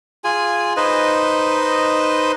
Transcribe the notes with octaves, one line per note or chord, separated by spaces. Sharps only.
F4 G#4 G#5
D#4 B4 C5 D#5